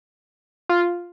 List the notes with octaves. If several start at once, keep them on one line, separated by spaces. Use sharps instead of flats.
F4